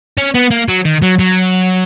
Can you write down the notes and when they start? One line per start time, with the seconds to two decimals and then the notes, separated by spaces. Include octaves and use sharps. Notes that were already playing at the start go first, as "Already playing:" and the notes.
0.18 C#4
0.34 B3
0.51 A#3
0.69 F#3
0.85 D#3
1.02 F#3
1.19 F#3